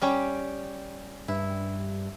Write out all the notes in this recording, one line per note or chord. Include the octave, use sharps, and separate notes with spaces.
G3 C#4 G4
G2 E4